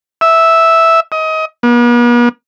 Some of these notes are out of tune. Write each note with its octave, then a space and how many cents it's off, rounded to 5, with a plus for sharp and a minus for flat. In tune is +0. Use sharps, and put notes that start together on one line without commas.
E5 -5
D#5 +25
B3 -45